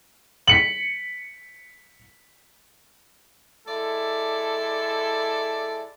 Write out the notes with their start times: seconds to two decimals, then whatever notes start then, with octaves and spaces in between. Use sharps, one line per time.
0.48 B6 C#7 F#7
3.68 G#3 E4 A4 D5